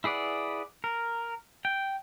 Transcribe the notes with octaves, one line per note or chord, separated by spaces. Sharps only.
E4 G#4 B4 D5 F#5
A#4
G5